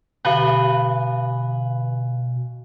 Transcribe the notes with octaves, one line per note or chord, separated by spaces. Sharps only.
B2 D3 B4 F5 G#5